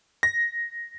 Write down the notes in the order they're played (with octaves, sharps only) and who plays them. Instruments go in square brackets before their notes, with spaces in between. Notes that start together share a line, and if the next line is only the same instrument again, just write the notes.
[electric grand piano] A#6